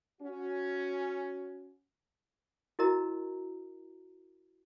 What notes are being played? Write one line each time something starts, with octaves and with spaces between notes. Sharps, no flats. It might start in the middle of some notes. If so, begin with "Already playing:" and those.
C#4 F#4
E4 F#4 A#4 D#5 A#5